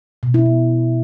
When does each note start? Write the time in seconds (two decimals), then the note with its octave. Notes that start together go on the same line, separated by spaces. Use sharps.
0.23 B2
0.34 E4
0.46 B3